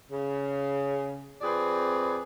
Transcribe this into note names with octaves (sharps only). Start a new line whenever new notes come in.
C#3
F2 C4 G#4 B4 D5